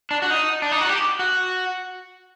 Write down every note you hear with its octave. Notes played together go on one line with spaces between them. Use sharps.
D4
F#4
D#4
D4
D#4
F#4
G4
F#4